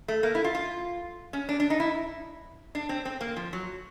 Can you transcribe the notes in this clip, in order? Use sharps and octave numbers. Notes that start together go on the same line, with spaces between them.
A3
A#3
E4
F4
F4
C#4
D4
D4
D#4
E4
D4
C4
C4
A#3
F3
F#3